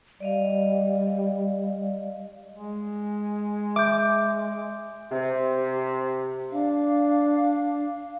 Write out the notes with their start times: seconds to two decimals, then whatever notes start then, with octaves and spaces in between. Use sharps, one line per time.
0.20 G3 D5 D#5 F5
2.54 G#3
3.76 E5 D6 G6
5.11 C3
6.52 D4 F5